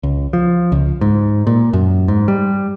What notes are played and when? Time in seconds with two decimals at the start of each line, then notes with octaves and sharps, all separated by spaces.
0.03 C#2
0.33 F3
0.72 C#2
1.01 G#2
1.47 A#2
1.73 F#2
2.08 G#2
2.28 G3